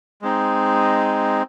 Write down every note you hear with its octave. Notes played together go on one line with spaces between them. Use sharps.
G#3 C4 D#4